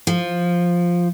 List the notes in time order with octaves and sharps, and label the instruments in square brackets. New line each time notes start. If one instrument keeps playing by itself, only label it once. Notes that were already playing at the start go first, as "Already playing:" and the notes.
[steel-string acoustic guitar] F3